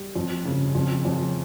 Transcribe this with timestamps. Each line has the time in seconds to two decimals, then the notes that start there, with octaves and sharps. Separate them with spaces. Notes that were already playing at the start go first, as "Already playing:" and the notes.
Already playing: G3
0.15 F2
0.45 C#3
0.75 F2
1.05 F2